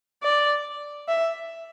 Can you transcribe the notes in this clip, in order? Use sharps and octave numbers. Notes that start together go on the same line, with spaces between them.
D5
E5